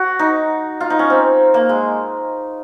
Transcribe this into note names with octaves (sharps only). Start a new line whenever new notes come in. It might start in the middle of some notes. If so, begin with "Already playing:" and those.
Already playing: F#4
D#4
F4
D#4
C#4
C4
A#3
G#3